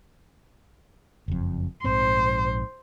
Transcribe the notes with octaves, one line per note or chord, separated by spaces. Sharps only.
F#1 F2
A#1 G#2 C4 C5